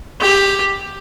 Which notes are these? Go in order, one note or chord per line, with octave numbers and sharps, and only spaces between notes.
G4